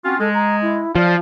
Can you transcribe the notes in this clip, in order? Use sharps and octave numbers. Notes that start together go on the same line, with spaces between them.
C4 C#4 F4 F#4
G#3 A4
A#5
E4
F3 D5 F5